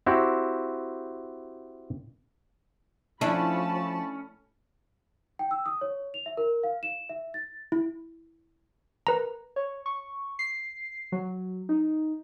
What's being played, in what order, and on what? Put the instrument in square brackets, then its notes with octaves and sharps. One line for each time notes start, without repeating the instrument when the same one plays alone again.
[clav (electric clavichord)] C4 E4 F#4 G4
[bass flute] F3 [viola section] A3 A5 B5 [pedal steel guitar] C#4 [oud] D4 E4
[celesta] G5
E6
D#6
C#5
F7
E5
A#4
F5
E7
E5
A6
[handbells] E4
A#4 B4 A#5
[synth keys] C#5
C#6
C7
F#3
D#4